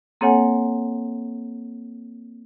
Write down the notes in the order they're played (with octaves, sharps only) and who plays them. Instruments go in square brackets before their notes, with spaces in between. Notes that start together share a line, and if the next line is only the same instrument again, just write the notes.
[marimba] A#3 C4 A4 C#5 F#5 G#5